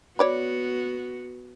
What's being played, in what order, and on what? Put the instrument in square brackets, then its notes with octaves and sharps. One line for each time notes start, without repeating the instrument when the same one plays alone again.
[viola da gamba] B3 F#4 [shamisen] C#5 D5 B5